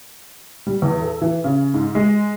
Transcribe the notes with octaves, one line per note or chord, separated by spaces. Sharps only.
G3
E2
A4
E3
C#3
G#2
G#3